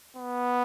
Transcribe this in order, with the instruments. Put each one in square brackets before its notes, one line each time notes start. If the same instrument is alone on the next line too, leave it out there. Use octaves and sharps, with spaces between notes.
[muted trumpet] B3